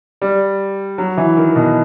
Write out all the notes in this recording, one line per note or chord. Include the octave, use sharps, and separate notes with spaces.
G3
F#3
E3
D#3
B2